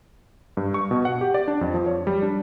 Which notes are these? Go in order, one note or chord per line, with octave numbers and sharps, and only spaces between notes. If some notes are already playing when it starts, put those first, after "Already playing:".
G2
C#6
B2
F#5
G4
D5
D4
F2
F3
C#5
G3
D4